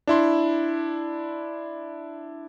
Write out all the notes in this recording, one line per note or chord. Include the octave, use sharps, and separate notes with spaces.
D4 E4 C6